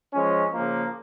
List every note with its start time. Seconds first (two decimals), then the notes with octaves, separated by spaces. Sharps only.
0.13 F3 G#3 C#4
0.53 C#3 F3 A#3